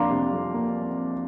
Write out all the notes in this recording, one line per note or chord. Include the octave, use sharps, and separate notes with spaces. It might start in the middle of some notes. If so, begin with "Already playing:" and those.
Already playing: F2 A#3 D4 F5 A#5 C6 D6
C3
F2
A#3